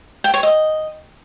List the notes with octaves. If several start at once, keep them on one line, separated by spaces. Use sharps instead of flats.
G5
C#5
D#5